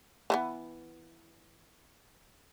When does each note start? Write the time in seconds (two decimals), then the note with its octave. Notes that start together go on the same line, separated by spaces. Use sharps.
0.30 E3 A3 B3